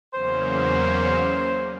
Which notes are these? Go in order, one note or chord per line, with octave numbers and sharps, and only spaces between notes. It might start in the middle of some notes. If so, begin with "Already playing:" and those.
E2 C#3 F#3 A#3 C#4 C5